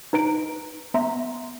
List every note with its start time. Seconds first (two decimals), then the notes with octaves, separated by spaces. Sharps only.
0.13 D#4 B4 A#5 D7
0.94 B3 E5 A#5 C6